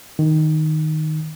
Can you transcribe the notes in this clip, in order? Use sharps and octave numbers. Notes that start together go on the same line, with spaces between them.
D#3